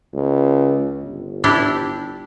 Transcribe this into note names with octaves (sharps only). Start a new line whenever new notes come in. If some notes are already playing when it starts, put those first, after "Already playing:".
C#2
G1
D4 E4 G4